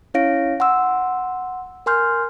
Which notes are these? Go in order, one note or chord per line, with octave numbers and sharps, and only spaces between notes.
C#4 E4 C#5 F5 A#6 D7
F#5 C6 E6
A#4 G#5 C6 F6 G6